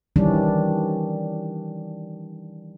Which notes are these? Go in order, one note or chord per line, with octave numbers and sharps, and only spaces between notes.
D#3 E3 G3 C#4 D4